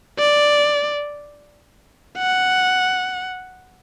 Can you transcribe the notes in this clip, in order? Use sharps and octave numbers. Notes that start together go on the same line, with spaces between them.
D5
F#5